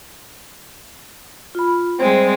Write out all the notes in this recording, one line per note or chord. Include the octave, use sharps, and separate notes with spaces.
F4 B5
G3 G#3 C4 C5